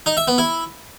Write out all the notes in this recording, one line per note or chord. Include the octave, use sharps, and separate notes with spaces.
D#4
E5
B3
E4